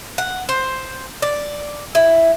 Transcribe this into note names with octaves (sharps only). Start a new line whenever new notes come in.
F#5
C5
D5
E4